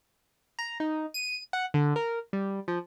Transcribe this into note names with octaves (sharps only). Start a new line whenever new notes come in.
A#5
D#4
D#7
F#5
D3
A#4
G3
F3